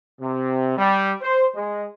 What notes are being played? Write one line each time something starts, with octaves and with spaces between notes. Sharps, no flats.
C3
G3
C5
G#3